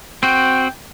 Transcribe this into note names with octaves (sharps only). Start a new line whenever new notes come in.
C4 F#4 G5